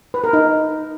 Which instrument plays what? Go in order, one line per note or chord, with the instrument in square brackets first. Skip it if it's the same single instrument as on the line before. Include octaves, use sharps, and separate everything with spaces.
[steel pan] B4
A#4
D#4